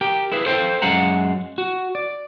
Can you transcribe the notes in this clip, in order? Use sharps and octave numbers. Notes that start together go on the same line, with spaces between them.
G4 A#4 G5
E4 G#4 B4 F5
A4 C5 F5 G5
F#2 G#3 F5 F#5 A#5
F#4
D5